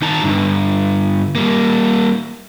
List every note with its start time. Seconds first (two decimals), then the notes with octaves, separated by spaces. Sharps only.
0.02 D#3 D#4 A5 A#5
0.22 G2 D3
1.35 G3 A#3